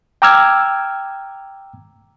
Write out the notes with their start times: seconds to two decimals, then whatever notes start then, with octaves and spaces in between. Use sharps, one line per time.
0.22 G5 A#5 D6 E6 F6 G#6